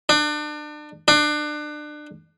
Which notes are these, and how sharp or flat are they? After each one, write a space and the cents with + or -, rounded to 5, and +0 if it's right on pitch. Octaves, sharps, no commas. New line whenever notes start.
D4 +35
D4 +30